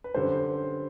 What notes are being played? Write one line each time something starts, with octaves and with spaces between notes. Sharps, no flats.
B4
F#2 D3 G3 C5